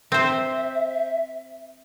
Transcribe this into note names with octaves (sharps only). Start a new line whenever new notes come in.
C4 C5 E5